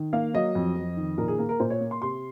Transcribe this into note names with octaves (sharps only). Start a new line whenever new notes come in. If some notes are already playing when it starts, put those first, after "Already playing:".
Already playing: D#3
A#3 F5
F#3 D#5
F2
F2
D#3
A#2 A#4
G#4
A#3 A#4
A#4
A#2 C5
C#5
A#3
C6
C3 C6